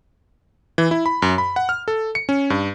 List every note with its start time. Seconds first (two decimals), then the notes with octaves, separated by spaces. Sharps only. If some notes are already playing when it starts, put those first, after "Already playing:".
0.78 E3
0.91 E4
1.06 B5
1.22 F#2
1.38 B5
1.56 F#5
1.69 F6
1.88 A4
2.15 C#7
2.29 C#4
2.50 G2